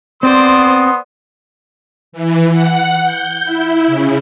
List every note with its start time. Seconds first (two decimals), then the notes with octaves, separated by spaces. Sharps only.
0.23 B3 C4 C5 D5 C6 D#6
2.12 E3
2.52 F#5
3.02 G6
3.44 E4
3.87 C#3